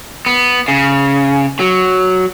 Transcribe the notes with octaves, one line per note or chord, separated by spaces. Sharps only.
B3
C#3
F#3